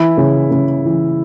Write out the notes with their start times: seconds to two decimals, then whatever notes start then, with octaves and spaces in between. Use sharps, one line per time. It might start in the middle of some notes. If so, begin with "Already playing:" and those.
Already playing: E3 E4
0.17 C#3
0.51 C#3
0.85 E3